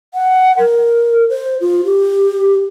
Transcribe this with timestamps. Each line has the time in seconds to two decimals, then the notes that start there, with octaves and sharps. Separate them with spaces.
0.14 F#5
0.58 A#4
1.30 C5
1.61 F4
1.85 G4